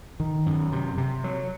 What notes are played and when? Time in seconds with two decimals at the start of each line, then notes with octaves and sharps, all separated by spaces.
0.20 D#3
0.46 F#2
0.72 C3
0.98 C3
1.24 F#3